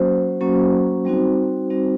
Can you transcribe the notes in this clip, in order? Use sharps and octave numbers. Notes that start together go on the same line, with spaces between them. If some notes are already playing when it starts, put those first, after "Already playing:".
Already playing: F#3 A#3 C#4 F#4 C5
F#3 A#3 C#4 F#4
G3 C4 D#4 F#4
G3 C4 D#4 F#4